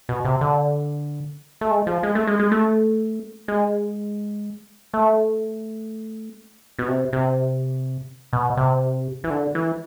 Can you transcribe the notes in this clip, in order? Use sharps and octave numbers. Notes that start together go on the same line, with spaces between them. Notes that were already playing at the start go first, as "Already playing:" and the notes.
B2
C3
D3
A3
G#3
F3
G#3
A3
G#3
G#3
A3
G#3
A3
B2
C3
C3
B2
C3
E3
D3
E3